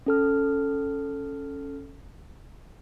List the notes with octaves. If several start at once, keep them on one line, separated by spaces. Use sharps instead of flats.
C#4 A4 F6